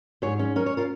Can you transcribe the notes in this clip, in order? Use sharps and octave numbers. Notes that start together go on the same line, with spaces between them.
G#2 G#4 C#5
C#4
C#4 A#4
C#5
F4 A#4